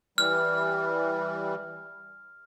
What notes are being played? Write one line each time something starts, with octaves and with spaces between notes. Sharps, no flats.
E3 G3 F6